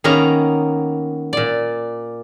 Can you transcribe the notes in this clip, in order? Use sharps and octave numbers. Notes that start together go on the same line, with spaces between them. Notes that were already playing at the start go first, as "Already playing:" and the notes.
D#3 A#3 B3 C#4 A#5
A#2 D5